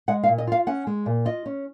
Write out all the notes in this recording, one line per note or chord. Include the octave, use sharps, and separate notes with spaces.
G#3 F#5
F5
A#2
D#5
F4 F5
C#4 F#5
G#3
A#2
F4 D#5
C#4